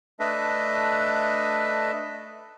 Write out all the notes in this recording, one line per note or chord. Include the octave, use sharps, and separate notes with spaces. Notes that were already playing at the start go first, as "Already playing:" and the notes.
A3 D4 A4 B4 D#5 E5